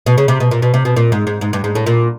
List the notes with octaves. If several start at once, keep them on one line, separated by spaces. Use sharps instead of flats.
B2
C#3
C3
B2
A#2
B2
C3
B2
A#2
G#2
G#2
G#2
G2
G#2
A2
A#2